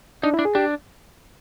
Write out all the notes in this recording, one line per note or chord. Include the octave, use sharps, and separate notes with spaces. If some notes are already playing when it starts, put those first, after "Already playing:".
D4 D#4
E4
D4
G#4
D4 G4